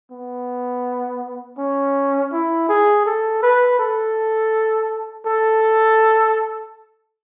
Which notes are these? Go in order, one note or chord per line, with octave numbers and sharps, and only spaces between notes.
B3
C#4
E4
G#4
A4
B4
A4
A4